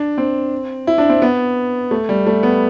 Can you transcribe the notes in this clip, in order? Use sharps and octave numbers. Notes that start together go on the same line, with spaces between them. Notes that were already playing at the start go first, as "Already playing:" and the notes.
Already playing: D4
C4
E4
D4
C4
B3
A3
G3
A3
B3